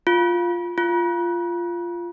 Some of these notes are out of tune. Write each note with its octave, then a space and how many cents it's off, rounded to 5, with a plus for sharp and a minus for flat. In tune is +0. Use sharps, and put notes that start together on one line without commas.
F4 +5
F4 -10